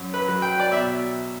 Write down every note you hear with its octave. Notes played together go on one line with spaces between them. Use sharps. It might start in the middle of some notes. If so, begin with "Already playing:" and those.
Already playing: F#2
B4
F#3
G5
D5
B2 E5